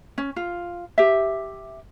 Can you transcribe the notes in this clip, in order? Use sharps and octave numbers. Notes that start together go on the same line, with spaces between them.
C#4
F4
G4 E5